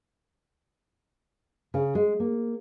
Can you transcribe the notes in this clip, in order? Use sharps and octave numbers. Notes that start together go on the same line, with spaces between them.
C#3
G#3
A#3